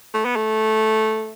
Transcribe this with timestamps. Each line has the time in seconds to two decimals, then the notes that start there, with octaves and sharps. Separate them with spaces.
0.14 A3
0.25 B3
0.36 A3